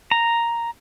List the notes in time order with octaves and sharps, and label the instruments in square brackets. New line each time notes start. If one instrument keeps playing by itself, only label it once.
[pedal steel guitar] A#5